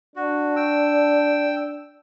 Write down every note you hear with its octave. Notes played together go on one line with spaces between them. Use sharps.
D4 F#4
G5 E6